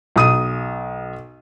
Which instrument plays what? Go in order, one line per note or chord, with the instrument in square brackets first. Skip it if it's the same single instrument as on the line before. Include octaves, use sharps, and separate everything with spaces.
[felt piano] B1 D#6 D#7